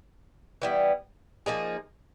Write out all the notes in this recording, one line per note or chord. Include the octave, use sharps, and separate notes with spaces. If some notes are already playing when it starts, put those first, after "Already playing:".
E3 G3 B3
F3 A#3 D#4 G#4